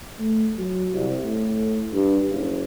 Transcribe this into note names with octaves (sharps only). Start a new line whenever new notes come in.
A3
F#3
C2
A2
G2
F#1